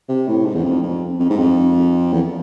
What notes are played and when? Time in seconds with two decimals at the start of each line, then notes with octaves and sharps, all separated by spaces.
0.09 C3
0.27 A2
0.46 G#2
0.55 E2
0.64 F2
0.83 F2
1.20 F2
1.30 G#2
1.38 F2
2.13 E2